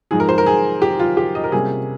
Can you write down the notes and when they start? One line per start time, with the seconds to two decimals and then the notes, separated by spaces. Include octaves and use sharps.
0.11 G#2 F3 G#3 D#4 G#4
0.20 A#4
0.29 C5
0.38 A#4
0.46 G#4
0.82 G4
1.00 F4
1.17 G4
1.35 D#5
1.44 A#4
1.52 C3 G3 A#3 C#4 G#4